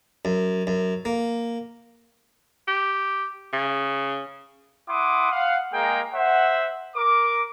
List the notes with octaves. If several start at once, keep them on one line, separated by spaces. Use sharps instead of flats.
F#2
F#2
A#3
G4
C#3
E4 F#5 C6 D6 D#6
F5 F#5
G#3 A#3 G#4 G5 A#5
C5 E5 F#5
A#4 D6